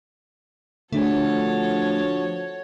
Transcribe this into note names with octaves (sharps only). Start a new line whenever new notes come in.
D3 F3 A3 D4 F#4 G#4 A4 C#5